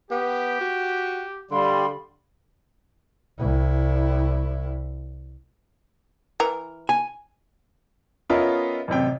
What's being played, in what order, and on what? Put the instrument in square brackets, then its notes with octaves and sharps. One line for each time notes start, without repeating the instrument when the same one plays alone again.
[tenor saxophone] B3 [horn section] G4
[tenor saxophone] F#4
[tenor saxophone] D3 [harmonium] G3 [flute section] F5 B5 C6
[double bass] C2 E4
[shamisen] E3 A#4
[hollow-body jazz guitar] G#5
[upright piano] B3 C#4 F4 A#4 D#5 E5
A1 F#2 C3 G5